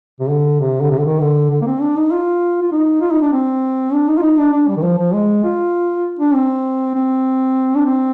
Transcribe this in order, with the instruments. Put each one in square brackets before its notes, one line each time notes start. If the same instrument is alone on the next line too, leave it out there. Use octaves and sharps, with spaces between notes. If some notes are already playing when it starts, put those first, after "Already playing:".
[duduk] C3
D3
C3
D3
C3
D3
D#3
D3
D3
A#3
C4
D4
D#4
F4
F4
D#4
F4
D#4
D4
C4
D4
D#4
F4
D#4
D4
D4
G3
D#3
F3
F3
G#3
F4
D4
C4
C4
D4
C4